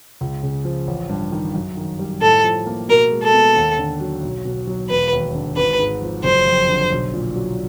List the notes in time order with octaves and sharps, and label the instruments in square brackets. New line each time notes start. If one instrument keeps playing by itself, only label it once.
[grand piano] C#2
C#3
F3
A1
G2
D#3
F#2
D#3
G3
[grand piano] A2 [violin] A4
[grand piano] F3
A#3
[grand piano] B2 [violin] A#4
[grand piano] G#3
[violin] A4
[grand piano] B3
D#2
D3
F#3
B1
B2
F#3
[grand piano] E1 [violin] B4
[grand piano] D#2
D3
[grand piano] G#1 [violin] B4
[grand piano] G#2
F3
[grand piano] F#1 [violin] C5
[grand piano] F2
D3
B1
A#2
F#3